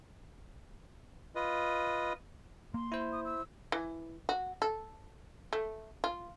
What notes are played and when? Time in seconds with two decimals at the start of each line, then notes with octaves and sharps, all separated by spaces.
1.35 F4 B4 D#5
2.74 A#3 C6
2.92 E4 C5
3.12 D#6
3.25 E6
3.72 E3
4.29 F#4
4.62 A4
5.53 A3
6.04 F4